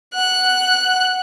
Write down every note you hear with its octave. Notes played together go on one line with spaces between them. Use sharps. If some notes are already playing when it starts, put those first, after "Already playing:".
F#5 F#6